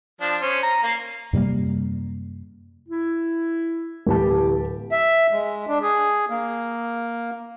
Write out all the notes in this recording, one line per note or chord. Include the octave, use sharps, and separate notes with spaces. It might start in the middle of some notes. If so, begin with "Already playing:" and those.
F3 D4
C#4 C5
A#5
A#3 F5
F#2 C3 G3 A#3
E4
D1 E3 G4 A5
E5
G#3
D4
G#4
A#3